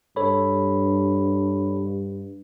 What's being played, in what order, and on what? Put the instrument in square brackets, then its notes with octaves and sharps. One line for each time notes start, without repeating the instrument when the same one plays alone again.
[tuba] G2 [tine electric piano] A4 C#5 B5